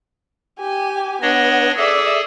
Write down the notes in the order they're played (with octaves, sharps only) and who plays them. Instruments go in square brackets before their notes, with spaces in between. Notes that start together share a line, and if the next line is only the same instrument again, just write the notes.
[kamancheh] G4 G#5
[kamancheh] B3 [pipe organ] D4 C#5 D#5
[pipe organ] G#4 A4 [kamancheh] D5 E5